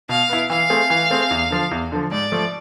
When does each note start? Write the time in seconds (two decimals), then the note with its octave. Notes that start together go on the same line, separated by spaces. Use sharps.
0.09 B2 F5
0.29 B3 E4
0.50 E3 F5
0.70 A3 C4 G#4
0.90 E3
1.10 A3 C4 G#4
1.31 E2
1.51 D3 F3
1.71 E2
1.92 D3 F3
2.12 G#2 D5
2.32 F3 A3